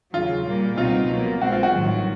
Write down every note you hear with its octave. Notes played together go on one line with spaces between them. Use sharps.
D#2 C#3 F#3 F4
A#2 G3 A#3
C#2 B2 G3 C4 D#4 F4
B2 F#3 A#3
B1 B2 G#3 C4 F#4
F4
F#4
A1 G2 D#3 F#3